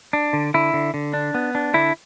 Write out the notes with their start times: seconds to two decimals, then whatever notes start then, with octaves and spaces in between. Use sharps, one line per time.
0.13 D4
0.33 D3
0.54 D3 E4
0.74 D3
0.94 D3
1.13 D4
1.34 B3
1.55 D4
1.74 D3 E4